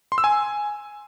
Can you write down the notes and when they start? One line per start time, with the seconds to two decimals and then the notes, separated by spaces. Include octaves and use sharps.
0.12 C6
0.18 E6
0.24 G#5